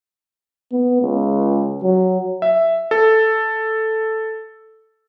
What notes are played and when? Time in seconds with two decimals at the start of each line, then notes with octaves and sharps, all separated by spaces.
0.72 B3
1.02 C#2
1.83 F#3
2.42 E5
2.91 A4